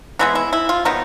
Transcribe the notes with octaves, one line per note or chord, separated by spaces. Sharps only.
E3 G#3 B3 E4
E4
E4
F4
D#3 F#3 B3 D#4